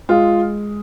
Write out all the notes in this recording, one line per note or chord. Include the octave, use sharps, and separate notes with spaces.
G#3 F4